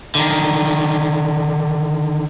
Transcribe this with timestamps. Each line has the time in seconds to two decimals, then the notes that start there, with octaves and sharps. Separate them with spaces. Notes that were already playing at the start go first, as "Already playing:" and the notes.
0.15 D3 D#3